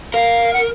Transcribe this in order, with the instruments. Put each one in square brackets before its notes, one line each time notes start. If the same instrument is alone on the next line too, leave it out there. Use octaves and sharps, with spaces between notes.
[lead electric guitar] A#4 [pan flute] F5
[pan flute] F#5